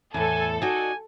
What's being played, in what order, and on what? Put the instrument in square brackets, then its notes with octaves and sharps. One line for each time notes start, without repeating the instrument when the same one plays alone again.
[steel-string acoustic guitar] E2 A2 [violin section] A4 [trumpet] G#5
[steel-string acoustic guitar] D#4 F#4 D5 [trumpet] G#5